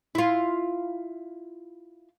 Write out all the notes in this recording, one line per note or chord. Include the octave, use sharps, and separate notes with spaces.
E4 F4